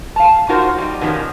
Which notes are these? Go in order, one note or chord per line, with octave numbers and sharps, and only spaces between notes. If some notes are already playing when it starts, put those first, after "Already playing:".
F5 A5
D#4 F4 F#4 A#4 C5
G3 D#4
B2 D#3 F3 B3 C#4 D#4